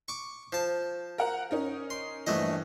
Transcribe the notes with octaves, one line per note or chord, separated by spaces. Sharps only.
C#6 D6
F3 A5
A#4 F#5 A#5
C#4 D#4 A#4
C6
A#1 G2 E3 A3 D#5